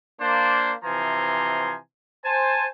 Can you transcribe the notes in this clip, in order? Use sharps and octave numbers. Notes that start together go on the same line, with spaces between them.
A#3 D4 C5
C3 E3 F3 G#5 A#5 C6
C5 G#5 A5